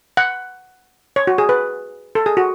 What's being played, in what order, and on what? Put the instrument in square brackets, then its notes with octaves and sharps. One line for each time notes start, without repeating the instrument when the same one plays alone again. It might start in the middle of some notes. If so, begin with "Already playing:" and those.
[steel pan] F#5
C#5
F#4
G#4
B4
A4
G#4
F#4